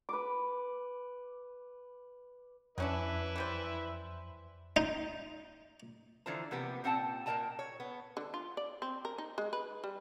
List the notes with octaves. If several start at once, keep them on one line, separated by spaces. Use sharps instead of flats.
B4 D6
F2 F#3 C#4 D4 E4 B4 E5
E3 G3 C5
D#4
D3 E3 F3 F4 C5 A#5
C3 F3 A#3 B3 G4
A#2 C4 F#5 G5 A5
A#2 A#3 A#4 D#5 A5 A#5
C#5
B3
D3
F4
D5
C4
A#4
D#4
G#3
B4
G3